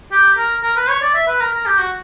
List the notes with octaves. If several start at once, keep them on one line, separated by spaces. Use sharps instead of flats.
G4
A#4
A#4
B4
C#5
D5
E5
B4
A#4
A#4
G4
F#4